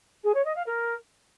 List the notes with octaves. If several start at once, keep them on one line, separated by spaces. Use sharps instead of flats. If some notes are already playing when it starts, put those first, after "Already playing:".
G#4
C#5
D#5
F5
A#4